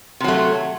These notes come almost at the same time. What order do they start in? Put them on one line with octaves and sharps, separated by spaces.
C3 F#3 A3